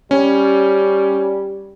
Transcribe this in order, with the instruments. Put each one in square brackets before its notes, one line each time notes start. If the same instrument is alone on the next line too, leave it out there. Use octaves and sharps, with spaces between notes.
[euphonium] G3 [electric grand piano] C#4